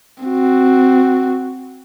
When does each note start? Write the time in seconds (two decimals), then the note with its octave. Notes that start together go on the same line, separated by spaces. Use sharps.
0.24 C4 F#4